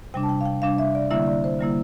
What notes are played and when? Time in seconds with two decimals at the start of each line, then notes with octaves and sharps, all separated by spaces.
0.14 C3 G3 D4 G5
0.23 A5
0.29 G5
0.41 F5
0.46 G5
0.62 C3 G3 D4 F5
0.78 E5
0.95 D5
1.11 D3 G3 A#3 E4 E5
1.27 D5
1.44 C5
1.59 D3 G3 A#3 E4